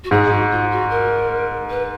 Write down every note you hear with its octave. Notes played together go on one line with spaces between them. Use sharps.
F#4
G#2 G#4
F#4
F4
F#4
A#4
B4